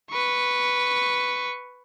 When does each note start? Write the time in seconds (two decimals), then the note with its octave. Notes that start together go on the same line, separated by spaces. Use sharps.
0.11 B4 C#6